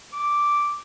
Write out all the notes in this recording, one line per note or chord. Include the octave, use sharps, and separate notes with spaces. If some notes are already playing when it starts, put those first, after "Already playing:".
D6